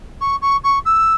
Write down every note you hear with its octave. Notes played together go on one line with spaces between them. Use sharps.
C#6
C#6
C#6
E6